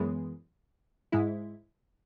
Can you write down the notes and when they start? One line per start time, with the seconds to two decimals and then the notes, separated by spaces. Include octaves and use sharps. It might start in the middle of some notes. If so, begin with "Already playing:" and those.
Already playing: F#2 E3 G#3 B3
1.12 G#2 G#3 E4